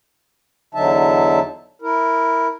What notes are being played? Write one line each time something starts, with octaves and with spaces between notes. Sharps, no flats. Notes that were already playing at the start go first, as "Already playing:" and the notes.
E2 D3 F#3 D#4 E5 A5
E4 A#4